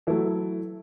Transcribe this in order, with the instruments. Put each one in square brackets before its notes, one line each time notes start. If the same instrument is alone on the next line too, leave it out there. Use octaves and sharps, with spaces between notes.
[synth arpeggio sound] E3 [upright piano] F#3 A3 E4 A4